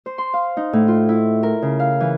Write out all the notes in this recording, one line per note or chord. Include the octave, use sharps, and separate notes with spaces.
C5
C6
F5
D#4
A2
F4
E4
A#4
C#3
F5
E3